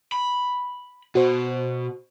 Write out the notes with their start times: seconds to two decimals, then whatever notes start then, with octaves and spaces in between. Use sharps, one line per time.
0.12 B5
1.15 B2 F#4 C5